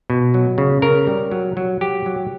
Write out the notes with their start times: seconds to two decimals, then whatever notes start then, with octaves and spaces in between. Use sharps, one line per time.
0.10 B2
0.34 F#3
0.58 C#3
0.82 C#3 A#4
1.07 G3
1.31 F#3
1.57 F#3
1.81 F#3 G4
2.06 F#3